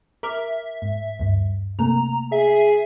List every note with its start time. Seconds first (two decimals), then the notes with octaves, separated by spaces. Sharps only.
0.23 A#4 E5 D6 F6
0.82 G#2
1.20 D2 G2
1.79 C3 A3 A#3 A#5
2.32 G#4 E5